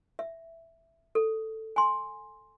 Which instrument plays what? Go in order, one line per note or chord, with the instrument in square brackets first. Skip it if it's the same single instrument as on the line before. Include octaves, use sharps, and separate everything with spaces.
[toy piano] E5
A4
G#5 C6